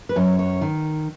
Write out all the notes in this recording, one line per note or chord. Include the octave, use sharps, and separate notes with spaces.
B4
F#2 C#5
C#5
D#3